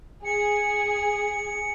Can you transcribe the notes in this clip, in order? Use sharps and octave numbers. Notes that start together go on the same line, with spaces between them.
G#4 C#7